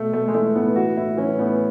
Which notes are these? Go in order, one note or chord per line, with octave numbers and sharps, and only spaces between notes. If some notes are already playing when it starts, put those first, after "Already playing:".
Already playing: B2 A3
B2 A3
G#3
E3 A3
A2 B3
E3 F#4
A2 E4
E3 C#4
A2 B3